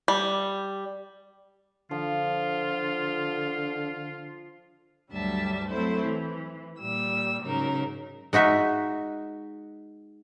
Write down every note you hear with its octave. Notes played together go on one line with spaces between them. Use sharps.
G3
D3 F3 F4
D2 G2 F#3 G3 E5 A5
F#3 A3 C4 E4 C5
E3
A#2 G3 E6
G#2 C#3 F#3 D#4 A#4
G#3 D#4 F#4 E5